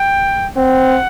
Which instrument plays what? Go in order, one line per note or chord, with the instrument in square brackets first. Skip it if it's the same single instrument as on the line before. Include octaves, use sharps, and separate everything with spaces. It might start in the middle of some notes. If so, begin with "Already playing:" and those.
Already playing: [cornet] G5
[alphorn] C4 [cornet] F#5